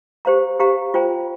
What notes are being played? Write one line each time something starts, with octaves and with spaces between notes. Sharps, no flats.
G4 C5 F5 A#5
G4 C5 F5 A#5
F4 C5 G5 A#5